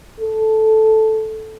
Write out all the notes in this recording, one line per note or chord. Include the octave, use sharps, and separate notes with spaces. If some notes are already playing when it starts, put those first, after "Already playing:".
A4